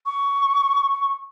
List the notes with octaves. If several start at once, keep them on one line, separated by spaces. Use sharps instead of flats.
C#6